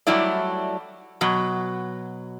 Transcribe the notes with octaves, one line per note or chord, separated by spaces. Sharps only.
F#3 G3 A3 E4 D5
B2 F#3